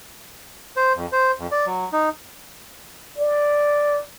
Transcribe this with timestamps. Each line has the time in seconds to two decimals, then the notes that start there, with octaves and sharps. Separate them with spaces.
0.77 C5
0.96 F2
1.12 C5
1.39 F2
1.52 D5
1.66 F#3
1.93 D#4
3.18 D5